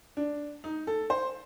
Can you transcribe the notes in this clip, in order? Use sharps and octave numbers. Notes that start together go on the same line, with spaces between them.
D4
D#4
A4
C5